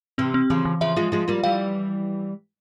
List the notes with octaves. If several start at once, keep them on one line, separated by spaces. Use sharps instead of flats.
C3 E3 C4
C4
C#3 E3 F3
E3
C#3 F3 E5
F3 G#3 F4
F3 G#3 F4
G3 A#3 F4
E3 G3 F5